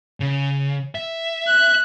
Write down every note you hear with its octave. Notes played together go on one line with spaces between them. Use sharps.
C#3
E5
F#6